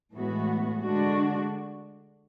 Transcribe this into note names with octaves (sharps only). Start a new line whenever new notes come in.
A2 E3 G#3 B3 F#4
D3 G#3 D4 F#4